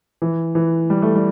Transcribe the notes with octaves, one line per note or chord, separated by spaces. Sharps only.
E3
E3
G3
A3
G3